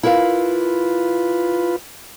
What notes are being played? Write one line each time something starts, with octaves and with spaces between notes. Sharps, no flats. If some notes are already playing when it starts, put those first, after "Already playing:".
E4 F4 A#4 B4 F5